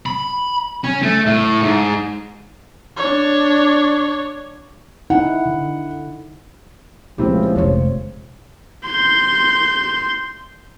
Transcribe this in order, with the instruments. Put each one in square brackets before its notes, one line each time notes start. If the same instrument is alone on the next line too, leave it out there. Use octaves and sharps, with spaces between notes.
[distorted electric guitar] B5
C#4
A3
A2
G#2
[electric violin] D4 C#5
[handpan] D#4 E4 [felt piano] F#5
[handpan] D3
[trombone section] C#2 F3 [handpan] A#2 G#3 [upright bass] A3 [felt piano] C4 E4 G4
[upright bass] F1 D#3 [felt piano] C5 C#5
[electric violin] C6 G6